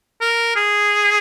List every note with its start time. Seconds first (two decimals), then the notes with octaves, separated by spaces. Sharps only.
0.21 A#4
0.56 G#4